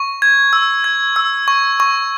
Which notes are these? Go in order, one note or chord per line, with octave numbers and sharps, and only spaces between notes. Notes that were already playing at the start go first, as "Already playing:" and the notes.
Already playing: C#6
G#6
E6
G#6
E6
C#6
C#6